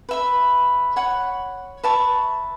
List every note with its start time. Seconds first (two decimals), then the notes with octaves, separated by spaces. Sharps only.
0.09 B4 E5 B5
0.96 C#5 F#5 B5
1.84 B4 E5 A5 C#6